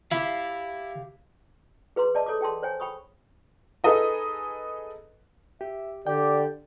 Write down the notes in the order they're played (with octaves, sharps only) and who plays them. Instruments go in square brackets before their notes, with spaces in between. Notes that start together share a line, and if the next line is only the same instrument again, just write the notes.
[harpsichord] E4 [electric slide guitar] G4 F5
[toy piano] G#4 B4 A#5 C6
G#4 D5 D#5 A5
G#4 A4 C#5 A#5 D6
G#4 G5 A5 C6
C5 C#5 G5 G#5
G5 B5 C#6 D#6
[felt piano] D#4 G#4 A4 B4 D#5 A#5
[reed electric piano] G4 [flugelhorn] E5
[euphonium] D3 [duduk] G4 [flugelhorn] D5 [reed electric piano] G5